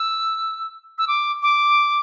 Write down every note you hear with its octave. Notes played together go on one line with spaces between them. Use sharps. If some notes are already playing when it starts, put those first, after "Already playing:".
Already playing: E6
E6
D6
D6